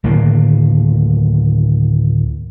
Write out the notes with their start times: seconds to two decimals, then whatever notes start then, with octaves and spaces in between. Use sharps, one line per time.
0.04 D2 A2 D#3 A#3